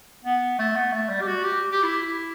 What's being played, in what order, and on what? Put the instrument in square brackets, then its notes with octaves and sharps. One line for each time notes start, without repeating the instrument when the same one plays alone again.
[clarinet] B3
A3
B3
A3
G3
G4
F#4
G4
G4
E4